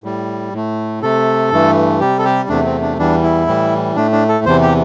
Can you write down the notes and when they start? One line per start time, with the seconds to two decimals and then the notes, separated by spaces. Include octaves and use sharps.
0.04 A2 G3
0.53 A2 A3
1.02 C3 A3 A4
1.52 G2 E3 A3
2.00 C3 G3 G4
2.19 A4
2.25 G4
2.49 E2 C3 A3 D4
2.65 C4
2.82 D4
2.98 E2 E3 G3 D4
3.23 E4
3.47 A2 E3 G3
3.96 A2 A3 D4
4.12 D4
4.29 A4
4.45 E2 C3 E3 C5
4.62 G4